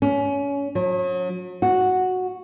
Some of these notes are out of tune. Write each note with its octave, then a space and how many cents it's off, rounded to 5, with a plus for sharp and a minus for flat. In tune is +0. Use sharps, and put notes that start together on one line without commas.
C#4 +25
F#3 -40
F#4 -5